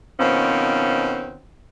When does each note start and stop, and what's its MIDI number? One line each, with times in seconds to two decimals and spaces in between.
0.20 1.39 47
0.20 1.39 51
0.20 1.39 53
0.20 1.39 60
0.20 1.39 61